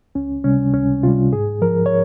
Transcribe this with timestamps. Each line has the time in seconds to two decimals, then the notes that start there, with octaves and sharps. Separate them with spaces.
0.15 C#2 C#4
0.44 C3 G3 C#4
0.74 C#2 C#4
1.03 C3 G3 F4
1.33 G#2 G#4
1.62 F3 A#4
1.86 C#5